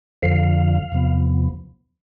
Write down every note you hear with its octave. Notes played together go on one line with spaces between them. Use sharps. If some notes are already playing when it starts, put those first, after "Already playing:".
F2 D3 F3 F5
E2 C3 F3 B3